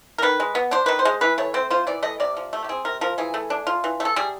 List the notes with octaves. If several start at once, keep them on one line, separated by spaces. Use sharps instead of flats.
A#4
D#3 B4
G#3
B3
D4 C5
D#3 B4
C5
G#3
E3 B4
A3 C#5
C4 C5
F4 C5
E3 D5
A3 D#5
C3 D5
F3
A3
G4
C4 G#4
C3 A#4
F3 A#4
E3 G#4
A3
D4
F4
E3
A3
A4
G3 G#4